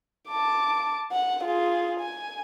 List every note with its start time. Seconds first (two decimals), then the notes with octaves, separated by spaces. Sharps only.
0.29 A5 D6
1.12 F#5
1.44 F4 G#4
2.00 G#5